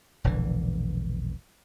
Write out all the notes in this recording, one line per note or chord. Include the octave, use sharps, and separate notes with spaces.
E1 A#1 D3 E3